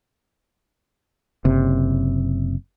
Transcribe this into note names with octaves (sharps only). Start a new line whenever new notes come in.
F#1 C3